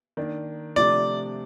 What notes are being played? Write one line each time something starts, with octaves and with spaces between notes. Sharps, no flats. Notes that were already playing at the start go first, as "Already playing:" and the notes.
D#3 A#3 D4
C3 F3 A3 D4 D5